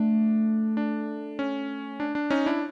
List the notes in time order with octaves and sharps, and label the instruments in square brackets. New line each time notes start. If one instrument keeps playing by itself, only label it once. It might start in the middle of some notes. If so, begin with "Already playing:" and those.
Already playing: [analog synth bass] A3 [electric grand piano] D4
[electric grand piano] D4
C#4
D4
D4
C#4 D#4
D4 E4